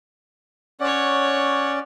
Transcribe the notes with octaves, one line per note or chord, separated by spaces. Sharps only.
C#4 C#5 D5 F#5